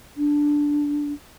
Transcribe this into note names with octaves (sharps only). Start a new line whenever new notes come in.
D4